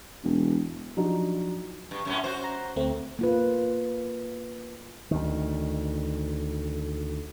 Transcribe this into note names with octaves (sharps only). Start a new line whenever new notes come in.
E1
F3 F#3 D4 D#4 F#4
G2
F#2 A2 C#4
F#4 C5
A#5
D2 A3 C4
A#3 F4 B4
D2 D#3